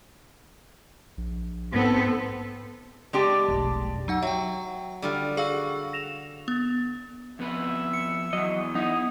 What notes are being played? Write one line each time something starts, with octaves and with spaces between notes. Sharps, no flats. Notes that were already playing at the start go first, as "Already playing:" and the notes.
A#1
G#2 B3 C4 A4
G#3 D4 G4
F1 B1
F#3 D#4 F#5
F#3 E5 G5
D3 G3 F4
F#4 G#4 F5 E6
A#6 E7 F7
B3
F2 B3 B4 E5
C#7
E2 F#3 D#5
B3 D#4 E4 D#6